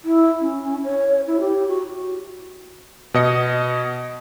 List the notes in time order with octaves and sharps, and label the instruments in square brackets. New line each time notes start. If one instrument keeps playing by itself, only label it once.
[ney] E4
C#4
C#5
E4
G4
F#4
[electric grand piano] B2 D#5 C#7